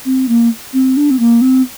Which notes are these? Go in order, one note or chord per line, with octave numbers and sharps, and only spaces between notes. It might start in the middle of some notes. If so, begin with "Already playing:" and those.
C4
A#3
C4
D4
C4
A#3
C4